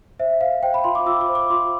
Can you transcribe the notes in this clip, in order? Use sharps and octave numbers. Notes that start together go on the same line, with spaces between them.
C5 E5
C5 F5
C5 G5
B5
F4 C6
D6
F4 E6
D6
C5
D6
F4 C6